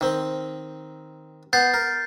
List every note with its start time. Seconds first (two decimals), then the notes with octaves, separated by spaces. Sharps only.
0.01 D#3 C4
1.53 B3 G6 A6 C7
1.74 A#4